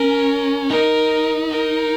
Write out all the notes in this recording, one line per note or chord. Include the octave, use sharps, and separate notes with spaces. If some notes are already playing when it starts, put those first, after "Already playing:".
Already playing: C#4 A#4
D#4 A#4
A#4